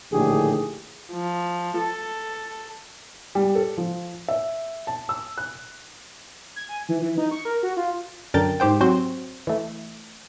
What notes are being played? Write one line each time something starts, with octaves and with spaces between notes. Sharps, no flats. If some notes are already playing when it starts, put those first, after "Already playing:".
A#1 A2 D3 D#3 G4 G#4
F3
A4
G3
A4
F3
E5
A5
E6
F#6
G#6
G#5
E3
E3
D#4
C#6
A#4
F#4
F4
F#2 D3 A#4 G5 A5 A6
G#2 G4 C5 G5
F#3 C4 F#4 C5
E3 A3